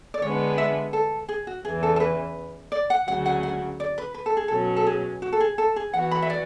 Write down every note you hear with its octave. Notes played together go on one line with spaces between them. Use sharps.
D5
D3 G#3 B3 D4 C#5
E5
A4
G#4
F#4
E2 C#3 E3 G#4
A4
A4
B4
D5
F#5
D2 C#3 F#3 F#5
F#5
F#5
D5
B4
B4
A4
G#4
B2 F#3 C#4 A4
A4
G#4
F#4
A4
G#4
A4
G#4
E3 B3 F#4 F#5
B5
E5
D5